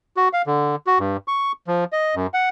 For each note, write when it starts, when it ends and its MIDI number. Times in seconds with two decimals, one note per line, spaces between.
0.17 0.28 66
0.33 0.42 77
0.47 0.76 50
0.87 0.98 66
0.99 1.17 43
1.28 1.52 85
1.67 1.84 53
1.92 2.15 75
2.15 2.27 42
2.34 2.49 78